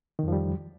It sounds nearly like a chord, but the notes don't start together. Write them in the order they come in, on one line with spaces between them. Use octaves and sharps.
D#3 F2 F3 G3